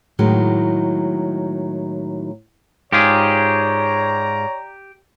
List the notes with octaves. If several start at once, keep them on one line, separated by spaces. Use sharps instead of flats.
A2 D#3 F#3 G#3
G#2 F4 G4 G#4 C#5 D5 A#5